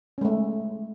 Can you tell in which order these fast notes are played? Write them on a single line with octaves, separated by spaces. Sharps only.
C#4 G#3 A3